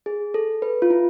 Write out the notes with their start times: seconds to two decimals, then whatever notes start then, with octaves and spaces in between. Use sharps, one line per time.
0.06 G#4
0.34 A4
0.62 B4
0.82 F4
0.90 E4